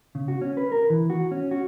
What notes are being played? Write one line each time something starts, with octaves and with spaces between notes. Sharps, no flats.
C#3
F#4
C#4
B4
A#4
E3
F#4
C#4
F#4